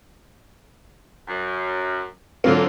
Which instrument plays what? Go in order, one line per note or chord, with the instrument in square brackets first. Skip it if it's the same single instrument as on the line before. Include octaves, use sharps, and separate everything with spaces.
[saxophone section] F#2
[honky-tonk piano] D3 F#3 C4 [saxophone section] A#3 F4